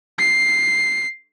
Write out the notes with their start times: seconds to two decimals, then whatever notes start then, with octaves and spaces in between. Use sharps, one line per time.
0.19 C7